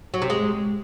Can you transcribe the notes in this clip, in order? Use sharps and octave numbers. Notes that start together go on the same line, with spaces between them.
F#3
C3
G#3